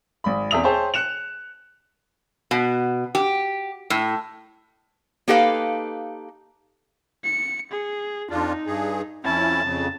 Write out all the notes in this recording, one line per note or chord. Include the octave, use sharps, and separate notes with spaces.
G#1 B5
E2 C4 E5 D#6 F7
G#4 C5 C#5 E5 G5 A5
F#6 C#7 E7 F7
B2
G4
A2
A#3 D#4 G4 A4 B4 F5
C#7
G#4
F2 D4 D#4 F4
G2 G#4
F2 C#4 E4 A5
F2 C#3